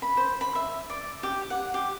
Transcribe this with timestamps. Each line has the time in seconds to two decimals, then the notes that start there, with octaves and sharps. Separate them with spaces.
0.02 B5
0.17 C5
0.41 B5
0.55 E5
0.90 D5
1.23 G4
1.50 F#5
1.74 G4